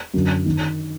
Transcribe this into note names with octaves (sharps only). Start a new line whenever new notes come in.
F#2 D3
D#3